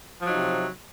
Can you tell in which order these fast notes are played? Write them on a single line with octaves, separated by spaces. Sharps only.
F3 F#3 D#4 C3